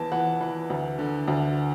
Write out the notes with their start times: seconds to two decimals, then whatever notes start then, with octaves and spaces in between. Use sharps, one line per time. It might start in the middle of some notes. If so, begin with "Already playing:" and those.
Already playing: E2 E3 A5
0.12 E3 F#5
0.41 E3
0.70 D2
0.99 D3
1.28 D2